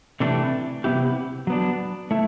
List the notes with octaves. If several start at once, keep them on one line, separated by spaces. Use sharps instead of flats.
C3 E3 A3 D4
C3 E3 B3 E4 G4
F#3 B3 D4
A3 E4